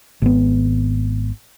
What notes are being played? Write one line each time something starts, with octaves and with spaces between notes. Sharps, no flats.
G#1 B3